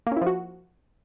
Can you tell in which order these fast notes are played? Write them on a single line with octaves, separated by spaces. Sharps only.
A#3 C#4 E4 F3 F#4